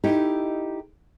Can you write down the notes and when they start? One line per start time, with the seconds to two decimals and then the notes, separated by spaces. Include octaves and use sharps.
0.04 D#4 E4 G4 A4 D#5